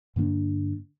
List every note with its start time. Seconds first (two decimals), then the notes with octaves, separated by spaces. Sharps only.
0.16 G2 D3 A#3 D4